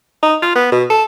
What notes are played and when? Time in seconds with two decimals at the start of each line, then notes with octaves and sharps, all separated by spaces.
0.23 D#4
0.43 F4
0.56 B3
0.72 B2
0.90 A4